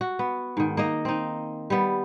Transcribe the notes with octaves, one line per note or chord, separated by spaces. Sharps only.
F#4
B3
G#2 D#3
A#3 D#4 D#5
C4 D#4
G3 B3